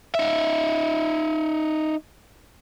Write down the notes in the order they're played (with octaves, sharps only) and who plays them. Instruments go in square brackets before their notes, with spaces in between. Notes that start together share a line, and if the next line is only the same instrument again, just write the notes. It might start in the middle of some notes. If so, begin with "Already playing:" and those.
[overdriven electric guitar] D#4 E5